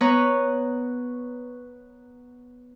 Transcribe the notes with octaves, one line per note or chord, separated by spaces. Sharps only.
B3 B4 C#5 A#5 C#6